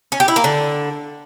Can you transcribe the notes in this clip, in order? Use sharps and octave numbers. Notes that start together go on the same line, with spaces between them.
C#4
G4
E4
A#3
D3